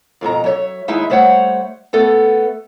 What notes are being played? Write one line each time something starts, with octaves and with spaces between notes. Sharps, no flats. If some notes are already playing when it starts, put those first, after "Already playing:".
F2 G#2 B2 A#5
F#3 C#5 E5
D#2 G#3 D#4 E4 E5
G3 A3 C5 C#5 F#5
A3 B3 A4